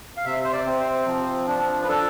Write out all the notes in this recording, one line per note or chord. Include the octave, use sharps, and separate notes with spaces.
F5
C3 E5
C5
D5
C4
C5
F3
D4
B4
D4 A4